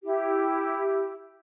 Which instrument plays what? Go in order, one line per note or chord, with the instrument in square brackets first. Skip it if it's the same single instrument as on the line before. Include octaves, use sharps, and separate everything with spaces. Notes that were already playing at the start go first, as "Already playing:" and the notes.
[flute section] E4 G4